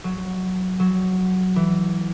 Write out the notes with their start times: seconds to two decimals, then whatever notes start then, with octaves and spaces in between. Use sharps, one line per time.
0.04 F#3
0.80 F#3
1.56 E3